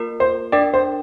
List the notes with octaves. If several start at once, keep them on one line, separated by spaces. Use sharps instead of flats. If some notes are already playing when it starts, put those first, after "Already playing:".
Already playing: A#3 F4 A#4
C5
D4 A#4 D5 G5
C5